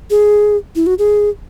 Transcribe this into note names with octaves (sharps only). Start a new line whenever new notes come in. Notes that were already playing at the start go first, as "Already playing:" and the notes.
G#4
E4
F#4
G#4